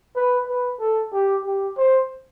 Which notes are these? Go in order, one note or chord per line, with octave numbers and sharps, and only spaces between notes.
B4
B4
A4
G4
G4
C5